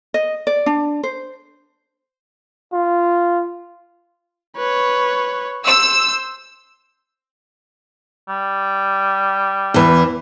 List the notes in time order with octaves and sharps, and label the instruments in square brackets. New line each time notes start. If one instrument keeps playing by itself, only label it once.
[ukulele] D#5
D5
D4
C5
[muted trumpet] F4
[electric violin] B4 C#5
[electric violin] C5 [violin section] E6
[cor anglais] G3
[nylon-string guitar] E2 E3